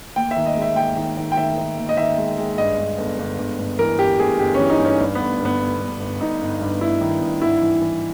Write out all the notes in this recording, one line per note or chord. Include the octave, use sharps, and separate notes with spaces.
D#2 G5
E5
D#3
D#5
G#3
E5
D#2 G5
D#3
D#3
G5
D#3 E5
D#3
D#2
D#5
D#3 E5
G#3
G#3
G2 D#5
G2
G1
G1
G1
G1
E3 A#4
G1 G4
G1 G#4
G1 G4
E3 C#4
D#4
G2
C#4
G2
G1 B3
G1
B3
G1
G1
G1
G1 D#4
G1
G2
G2 E4
D#3
G2
G#1 E4
E3
E3